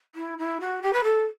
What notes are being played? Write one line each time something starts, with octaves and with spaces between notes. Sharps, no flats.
E4
E4
F#4
G4
B4
A4